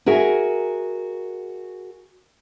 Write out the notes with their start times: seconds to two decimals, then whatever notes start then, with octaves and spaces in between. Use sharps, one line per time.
0.06 F#4 G#4 A#4 E5 G#5